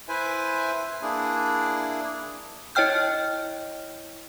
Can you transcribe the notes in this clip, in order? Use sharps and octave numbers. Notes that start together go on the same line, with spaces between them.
E4 B4 C5 E5 G#5
A#3 D4 E4 G#4
E4 C#5 D#5 G5 F6 G6